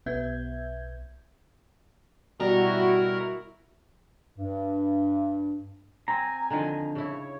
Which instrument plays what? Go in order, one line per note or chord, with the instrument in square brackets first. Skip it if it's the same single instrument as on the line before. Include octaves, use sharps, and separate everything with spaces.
[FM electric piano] B1 B3 E5 G6 G#6
[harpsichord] B2 G3 [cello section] E4 F#4 [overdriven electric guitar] A#4
[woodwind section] G2
[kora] C4 [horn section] G#5 [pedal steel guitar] A#5
[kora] D3 D#3 F3
[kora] C#3 E4 [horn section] C#5